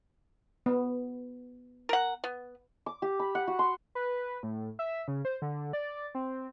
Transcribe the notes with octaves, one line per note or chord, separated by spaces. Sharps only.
B3
A#4 F#5
B3
D6
G4
B5
F#5
F#4
C6
B4
A2
E5
C#3
C5
D3
D5
C4